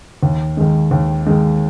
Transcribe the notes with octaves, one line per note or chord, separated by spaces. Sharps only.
D#2
D#3 G#3
D#2
D#3 G#3